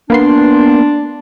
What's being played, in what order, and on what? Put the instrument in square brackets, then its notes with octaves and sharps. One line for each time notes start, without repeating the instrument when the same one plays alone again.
[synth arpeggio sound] A#3 B3 C6 [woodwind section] D4